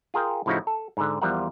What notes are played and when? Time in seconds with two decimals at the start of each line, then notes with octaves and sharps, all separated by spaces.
0.14 F4 G#4 A#4 G5
0.46 A2 C#3 F3 D#4 E4 F#4
0.67 A4
0.97 G#2 D3
1.22 E2 F3 G3 F4 A#4 F#5